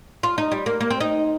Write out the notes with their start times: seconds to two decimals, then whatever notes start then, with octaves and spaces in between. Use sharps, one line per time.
0.23 F4
0.38 D#4
0.51 G3
0.66 A#3
0.81 A#3
0.90 C4
1.00 D#4